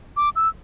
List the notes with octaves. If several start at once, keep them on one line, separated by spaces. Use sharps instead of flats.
D6
E6